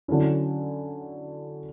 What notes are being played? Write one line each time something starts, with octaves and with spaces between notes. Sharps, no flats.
D3 F#3 C#4 E4